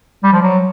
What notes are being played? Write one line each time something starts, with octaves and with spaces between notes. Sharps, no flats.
G3
F3
F#3